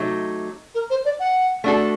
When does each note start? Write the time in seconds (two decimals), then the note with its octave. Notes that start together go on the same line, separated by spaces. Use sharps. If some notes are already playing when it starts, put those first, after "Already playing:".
Already playing: C3 F#3 A3 D#4
0.74 A#4
0.90 C5
1.05 D5
1.19 F#5
1.64 A3 D4 F#4 A4